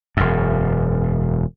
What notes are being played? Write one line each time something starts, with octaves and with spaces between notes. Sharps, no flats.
E1 F#2